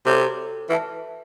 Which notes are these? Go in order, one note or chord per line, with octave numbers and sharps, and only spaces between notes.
C3 F#4 A4 C#5
E3 B4 E5 A5